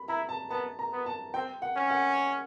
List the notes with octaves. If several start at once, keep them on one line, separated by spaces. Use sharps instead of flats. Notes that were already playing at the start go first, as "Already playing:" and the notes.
Already playing: B5
E4 A#5
A5
B3 A5
A#5
B3
A5
C4 G5
F#5
C#4
F#5